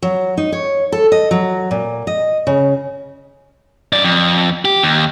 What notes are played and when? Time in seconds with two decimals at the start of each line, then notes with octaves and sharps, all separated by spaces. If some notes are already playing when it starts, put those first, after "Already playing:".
0.02 F#3
0.37 D#4
0.52 C#5
0.92 A4
1.12 D#5
1.31 F#3
1.71 A#2
2.07 D#5
2.47 C#3
3.93 F#2 D5
4.04 F2
4.65 G4
4.83 D#2